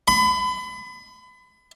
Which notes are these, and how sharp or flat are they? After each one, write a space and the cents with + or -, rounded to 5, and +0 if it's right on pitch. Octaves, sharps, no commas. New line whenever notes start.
B5 +35